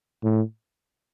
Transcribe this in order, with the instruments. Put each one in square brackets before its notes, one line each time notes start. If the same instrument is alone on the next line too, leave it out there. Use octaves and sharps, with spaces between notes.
[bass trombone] A2